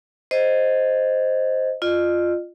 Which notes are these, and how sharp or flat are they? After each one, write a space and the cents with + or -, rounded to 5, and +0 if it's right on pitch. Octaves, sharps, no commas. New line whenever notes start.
C5 +0 D#5 +0
F4 +0 D#5 -40